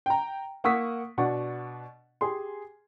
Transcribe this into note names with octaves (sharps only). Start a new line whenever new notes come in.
G5 A#5
A#3 F#5 C#6 D#6 E6 B6
B2 D4 F#5 C#6
G4 G#4 C6